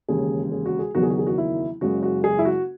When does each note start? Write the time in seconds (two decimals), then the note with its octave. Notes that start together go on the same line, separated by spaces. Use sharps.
0.08 E1 D#2 C#3 G#4
0.52 G#4
0.66 F#4
0.79 G#4
0.95 F#1 E2 D#3 F#3 F#4
1.03 G#4
1.10 F#4
1.19 G#4
1.27 F#4
1.38 E4
1.81 F#1 F#2 C#3 G#3 F#4
2.03 F#4
2.24 G#4
2.39 E4
2.45 F#4